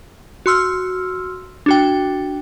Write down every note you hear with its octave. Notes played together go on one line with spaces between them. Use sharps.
F#4 C6 E6 F6
D4 F#4 G5